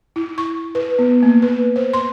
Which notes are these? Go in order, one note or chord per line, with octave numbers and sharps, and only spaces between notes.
E4
C#6
B4
B3
A#3
B4
C5
C6